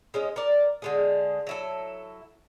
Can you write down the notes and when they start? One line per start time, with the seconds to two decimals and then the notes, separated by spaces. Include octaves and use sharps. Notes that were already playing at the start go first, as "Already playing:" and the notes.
0.14 G#3 C#4 D#5
0.36 A#4 D5
0.82 D3 G#3 G#4
1.47 F#3 E4 A4